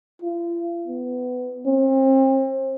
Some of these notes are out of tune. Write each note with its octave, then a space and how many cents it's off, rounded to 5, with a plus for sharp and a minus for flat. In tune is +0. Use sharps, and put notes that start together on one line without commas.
F4 -40
B3 +20
C4 +35